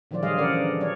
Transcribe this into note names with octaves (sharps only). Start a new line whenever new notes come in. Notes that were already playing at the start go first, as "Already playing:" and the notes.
A#2 D#3 F3 F#3 F4 D5
D3 F3 G3 G#4 D#5 F5
C#3 E3 A#4 D5 F#5
D3
F#3 B3 C#5 D5